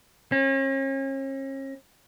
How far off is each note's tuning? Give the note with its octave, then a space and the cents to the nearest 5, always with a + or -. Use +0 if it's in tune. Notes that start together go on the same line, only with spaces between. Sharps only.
C#4 -40